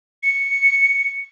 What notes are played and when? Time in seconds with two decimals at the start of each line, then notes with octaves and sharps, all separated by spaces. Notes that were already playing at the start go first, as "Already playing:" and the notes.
0.23 C#7